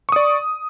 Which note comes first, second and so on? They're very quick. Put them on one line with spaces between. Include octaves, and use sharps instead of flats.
C#6 D#6 D5